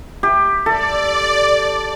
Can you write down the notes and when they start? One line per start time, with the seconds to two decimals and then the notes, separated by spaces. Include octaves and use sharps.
0.23 G4
0.66 A4 D5